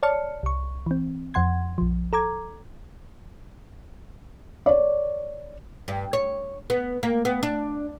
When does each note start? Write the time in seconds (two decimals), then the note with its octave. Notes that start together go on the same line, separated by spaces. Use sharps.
0.03 C#5 D5 A5 F6 C#7
0.43 C2 C#6
0.86 E3 C4
1.34 F2 F3 F#5 C6 G#6
1.78 A#1 F3
2.13 A4 A#5 D6 G#6
4.66 C#5 D5
5.88 G2
6.13 C#5
6.70 B3
7.03 A#3
7.25 B3
7.43 D4